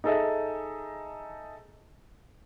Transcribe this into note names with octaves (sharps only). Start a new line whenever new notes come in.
D#4 G#4 A4 D#5 E5